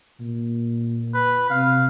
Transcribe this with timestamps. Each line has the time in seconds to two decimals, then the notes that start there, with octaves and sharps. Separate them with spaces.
0.20 A#2
1.14 B4
1.50 C3 F5